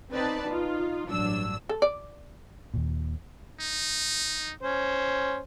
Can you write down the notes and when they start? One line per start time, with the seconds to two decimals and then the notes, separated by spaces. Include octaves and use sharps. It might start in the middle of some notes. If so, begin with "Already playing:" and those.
0.12 B3 C4 D#4 B4 D5 A5
0.47 D#4 F4
1.08 A1 G2 F#3 D4 E6
1.69 A4
1.82 D5
2.74 D#2 A#2
3.60 D#4
4.62 C#4 C5